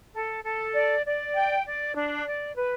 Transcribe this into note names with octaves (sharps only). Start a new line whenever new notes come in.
A4
A4
D5
D5
G5
D5
D4
D5
B4